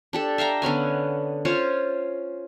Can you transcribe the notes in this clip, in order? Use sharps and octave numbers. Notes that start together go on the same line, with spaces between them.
D4 G4 A4
E5 F5 G5 A#5
D3 B3 C#4 G#5
C#4 F4 C5 C#5